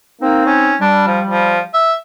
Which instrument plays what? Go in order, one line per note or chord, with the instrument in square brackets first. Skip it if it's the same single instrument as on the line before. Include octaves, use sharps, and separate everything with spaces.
[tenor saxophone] A#3 [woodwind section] C4 D#4
[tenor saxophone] C#4
[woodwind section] G3 [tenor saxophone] D4
[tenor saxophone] F3
F3
E5